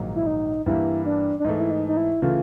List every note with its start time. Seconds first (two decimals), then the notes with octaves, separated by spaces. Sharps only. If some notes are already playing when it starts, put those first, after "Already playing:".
Already playing: A#1 G#2 D#3 F#3 A#3
0.16 E4
0.26 D#4
0.66 G2 E3 G3 A#3 E4
1.06 D4
1.40 D4
1.44 G#2 E3 A3 D#4
1.60 E4
1.71 D#4
1.88 D#4
1.97 E4
2.22 C#3 E3 A3 F4